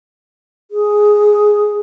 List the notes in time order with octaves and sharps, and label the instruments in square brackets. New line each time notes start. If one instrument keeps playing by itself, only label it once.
[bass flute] G#4